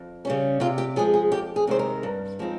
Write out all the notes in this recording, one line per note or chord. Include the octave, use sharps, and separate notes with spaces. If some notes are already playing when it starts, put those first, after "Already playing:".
Already playing: F2
C#3 G3 C#4
C3 F4
G4
F3 G#3 G#4
G#4
F2 G4
G#4
C3 D#3 G#3 C5
A#4
G2
F3 G#3 C4 D#4